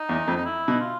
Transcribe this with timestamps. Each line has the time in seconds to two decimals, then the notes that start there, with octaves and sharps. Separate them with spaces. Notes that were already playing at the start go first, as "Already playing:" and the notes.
Already playing: D#4
0.09 E2
0.28 F2
0.36 D#4
0.45 E4
0.68 B2
0.80 F4